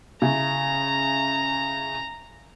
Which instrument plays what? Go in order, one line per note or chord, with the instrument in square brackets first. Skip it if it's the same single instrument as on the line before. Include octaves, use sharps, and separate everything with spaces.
[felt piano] C#3 E4 [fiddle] A#5